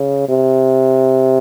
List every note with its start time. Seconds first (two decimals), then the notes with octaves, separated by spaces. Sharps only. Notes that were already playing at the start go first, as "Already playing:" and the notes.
Already playing: C#3
0.29 C3